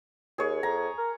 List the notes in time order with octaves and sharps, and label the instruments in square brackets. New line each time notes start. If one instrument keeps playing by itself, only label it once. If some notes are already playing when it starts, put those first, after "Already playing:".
[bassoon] D#2 [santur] G#4 C#5
[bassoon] F2 [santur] A#5
[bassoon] A#4